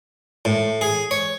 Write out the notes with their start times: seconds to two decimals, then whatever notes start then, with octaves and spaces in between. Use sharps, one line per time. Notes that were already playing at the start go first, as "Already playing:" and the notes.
0.45 A2
0.81 G#4
1.11 C#5